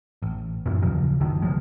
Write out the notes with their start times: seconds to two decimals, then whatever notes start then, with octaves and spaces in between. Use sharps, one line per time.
0.22 A1
0.66 F#2 A#2
0.82 D#2 C#3 F3 F#3
1.20 F#1 C#2 D3 D#3
1.42 C#3 F3 G#3